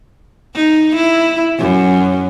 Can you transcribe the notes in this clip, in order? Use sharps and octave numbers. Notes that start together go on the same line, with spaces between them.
D#4
E4
F#2